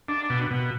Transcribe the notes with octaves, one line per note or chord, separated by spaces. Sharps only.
D4
B2
B2